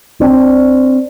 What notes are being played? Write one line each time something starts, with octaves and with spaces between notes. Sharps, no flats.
C4 D4